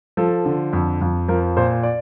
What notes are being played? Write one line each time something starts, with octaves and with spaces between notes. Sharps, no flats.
F3 A4
D3
F2
F2
F3 A#4
A#2 C5
D5